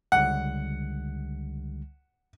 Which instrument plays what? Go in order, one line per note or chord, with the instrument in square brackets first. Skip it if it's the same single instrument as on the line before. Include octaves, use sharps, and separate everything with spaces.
[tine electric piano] C#2 D3 G3 [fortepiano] F#5